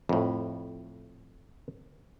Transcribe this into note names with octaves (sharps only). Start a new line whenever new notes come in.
F2 A2